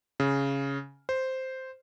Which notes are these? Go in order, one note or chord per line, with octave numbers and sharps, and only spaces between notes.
C#3
C5